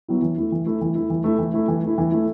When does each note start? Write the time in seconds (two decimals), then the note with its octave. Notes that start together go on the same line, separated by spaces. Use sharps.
0.08 F#3 B3 E4
0.22 E3
0.38 A3 E4
0.52 E3
0.66 A3 E4
0.81 E3
0.95 A3 E4
1.10 E3
1.24 A3 E4
1.39 E3
1.54 A3 E4
1.68 E3
1.83 A3 E4
1.98 E3
2.12 A3 E4